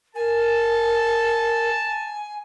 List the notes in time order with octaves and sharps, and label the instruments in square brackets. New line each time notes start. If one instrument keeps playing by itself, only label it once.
[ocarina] A#4 [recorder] G#5 [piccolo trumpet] A5